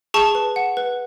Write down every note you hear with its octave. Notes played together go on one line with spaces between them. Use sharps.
G#4 A5 C#6
B4
F#5
B4